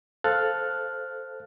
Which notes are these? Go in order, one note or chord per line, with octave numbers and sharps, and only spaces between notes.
A4 C5 F5 F6 F#6 A6